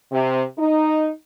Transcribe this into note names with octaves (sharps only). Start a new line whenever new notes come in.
C3
D#4